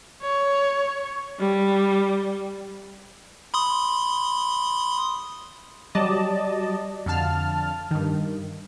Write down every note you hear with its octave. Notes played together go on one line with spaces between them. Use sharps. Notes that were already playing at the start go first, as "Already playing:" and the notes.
C#5
G3
B5 C6 D#6
F#3 G3 D5 D#5 A5
F2 D3 F5 A5 F6
G2 D#3